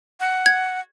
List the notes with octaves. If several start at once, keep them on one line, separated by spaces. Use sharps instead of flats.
F#5
G#6